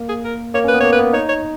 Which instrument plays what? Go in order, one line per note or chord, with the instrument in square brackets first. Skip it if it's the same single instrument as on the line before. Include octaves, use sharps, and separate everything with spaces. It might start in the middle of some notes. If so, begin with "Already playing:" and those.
Already playing: [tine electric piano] A#3
[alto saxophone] G#4
A#4
[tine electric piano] A#3 [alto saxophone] C#5
[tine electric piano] C#4
[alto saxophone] B4
[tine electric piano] B3
[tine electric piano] A#3 [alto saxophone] C#5
[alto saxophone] B4
[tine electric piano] B3
[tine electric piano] D#4 [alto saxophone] C#5
[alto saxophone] C#5